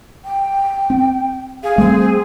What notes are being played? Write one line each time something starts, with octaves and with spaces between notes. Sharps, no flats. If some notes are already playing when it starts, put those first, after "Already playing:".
G5
C4
G#4 F5
G3 A3 C4